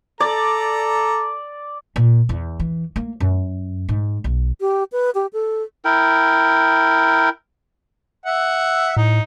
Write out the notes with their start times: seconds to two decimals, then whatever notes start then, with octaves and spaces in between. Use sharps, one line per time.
0.20 A4 D5 A#5
1.96 A#2
2.29 E2
2.60 E3
2.96 A#3
3.20 F#2
3.89 G#2
4.24 B1
4.60 G4
4.92 B4
5.15 G4
5.33 A4
5.85 E4 A#4 G5
8.26 E5 F#5
8.97 A2 D#4